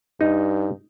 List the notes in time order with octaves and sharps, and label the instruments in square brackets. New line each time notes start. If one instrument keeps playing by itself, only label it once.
[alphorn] G2 [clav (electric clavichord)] D#4